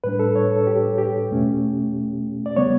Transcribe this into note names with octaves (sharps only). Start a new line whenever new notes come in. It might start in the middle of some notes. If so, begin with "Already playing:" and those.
A2 G3 D4 B4
A4
C#5
A4
G4
G4
E2 B2 A3 C#4
D5
C#3 G3 B3 C#5